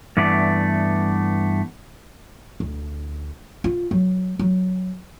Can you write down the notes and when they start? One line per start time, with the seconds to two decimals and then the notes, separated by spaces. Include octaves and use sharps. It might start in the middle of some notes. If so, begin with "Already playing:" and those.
0.17 G2 E3 A3 B3 D5
2.60 D2
3.64 F4
3.91 F#3
4.39 F#3